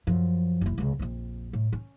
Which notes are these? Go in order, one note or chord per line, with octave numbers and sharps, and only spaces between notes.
F#2 F3
F#1 E4
C#2 C#3
A#1 F2
A2
C#4